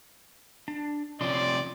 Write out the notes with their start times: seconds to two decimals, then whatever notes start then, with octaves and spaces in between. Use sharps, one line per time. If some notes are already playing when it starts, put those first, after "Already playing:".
0.68 D4
1.21 C3 F3 C#4 D5 C6